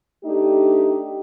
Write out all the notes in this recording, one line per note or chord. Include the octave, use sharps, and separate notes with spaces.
A3 D4 D#4 G4